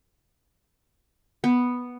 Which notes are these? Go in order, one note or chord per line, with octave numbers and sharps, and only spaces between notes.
B3